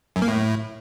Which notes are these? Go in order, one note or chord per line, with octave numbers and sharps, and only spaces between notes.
F#2
A#3
A2